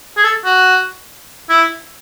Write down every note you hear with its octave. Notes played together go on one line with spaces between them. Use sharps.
G#4
A4
F#4
E4